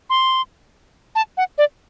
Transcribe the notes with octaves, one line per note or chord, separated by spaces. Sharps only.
C6
A5
F#5
D5